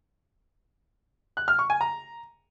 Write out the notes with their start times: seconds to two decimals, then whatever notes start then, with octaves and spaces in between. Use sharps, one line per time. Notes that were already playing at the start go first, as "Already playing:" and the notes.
1.37 F#6
1.48 F6
1.59 C#6
1.70 G#5
1.81 A#5